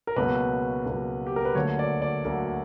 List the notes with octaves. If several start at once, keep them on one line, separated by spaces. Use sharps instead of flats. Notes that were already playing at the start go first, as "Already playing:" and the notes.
A#4
C#2 B2 F#3 A#3 B4
C#2 B2 F#3 A#3
G4
A#4
B4
D2 D3 F#3 A#3 C#5
D5
D5
D2 D3 F#3 A#3